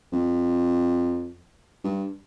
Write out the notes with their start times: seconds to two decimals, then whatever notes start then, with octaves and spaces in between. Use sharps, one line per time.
0.12 F2
1.84 G2